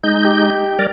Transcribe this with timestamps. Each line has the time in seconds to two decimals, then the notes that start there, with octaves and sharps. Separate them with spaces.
0.04 G#3 D#4 G6
0.25 G4
0.79 G3 A#4 D5